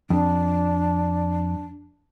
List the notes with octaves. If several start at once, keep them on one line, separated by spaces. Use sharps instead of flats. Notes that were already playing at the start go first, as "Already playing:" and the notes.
F2 D4